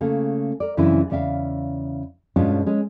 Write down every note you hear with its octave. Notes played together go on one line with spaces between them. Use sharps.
C#3 A3 A#3
A#4 D5
F#2 C#3 E3 C4 D4 E4
E2 C#3 D5 E5 F5
G2 B2 G#3 C#4 D4 F4
G#3 C#4